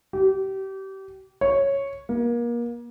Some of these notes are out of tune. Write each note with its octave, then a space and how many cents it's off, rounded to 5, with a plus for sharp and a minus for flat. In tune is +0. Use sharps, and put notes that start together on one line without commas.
G4 -30
C#5 -5
A#3 +30